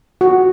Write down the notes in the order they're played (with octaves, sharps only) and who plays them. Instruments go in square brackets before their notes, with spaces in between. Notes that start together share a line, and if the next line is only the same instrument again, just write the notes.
[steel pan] F#4